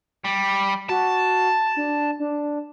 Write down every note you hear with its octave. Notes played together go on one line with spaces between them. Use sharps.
G3
F#4 A5
D4
D4